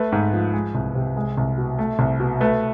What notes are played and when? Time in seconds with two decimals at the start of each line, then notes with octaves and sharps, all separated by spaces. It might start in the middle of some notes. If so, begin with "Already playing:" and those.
Already playing: A3 B4
0.12 G#2
0.33 F3
0.54 G#3
0.75 C2
0.95 C3
1.17 G#3
1.37 C2
1.58 B2
1.79 A3
1.99 C2
2.20 B2
2.41 A3 B4